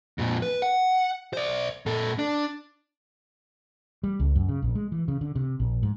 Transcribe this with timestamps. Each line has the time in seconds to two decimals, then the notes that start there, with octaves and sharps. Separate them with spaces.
0.18 F2 A#2
0.42 B4
0.62 F#5
1.33 C5 D5
1.86 A#2 A4
2.19 D4
4.03 G3
4.19 C#2
4.35 F#2
4.49 C#3
4.62 A#1
4.75 G#3
4.92 E3
5.08 C#3
5.21 D3
5.35 C3
5.60 A#1
5.83 G#2